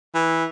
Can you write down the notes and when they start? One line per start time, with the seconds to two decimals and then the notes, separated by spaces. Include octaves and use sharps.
0.15 E3